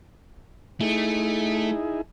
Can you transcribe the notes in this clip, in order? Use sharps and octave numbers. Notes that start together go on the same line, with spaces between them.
A3 D#4 E4 G#4